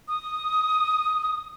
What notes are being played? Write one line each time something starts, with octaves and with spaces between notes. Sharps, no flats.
D#6